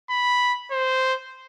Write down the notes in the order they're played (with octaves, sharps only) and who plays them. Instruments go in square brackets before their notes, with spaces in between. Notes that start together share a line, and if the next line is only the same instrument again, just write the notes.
[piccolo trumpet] B5
C5